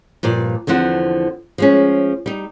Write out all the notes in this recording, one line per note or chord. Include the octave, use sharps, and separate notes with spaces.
G2 A#2 F3 D5
E2 D3 F3 C4 F#5
F3 G#3 C#4
G3 D#4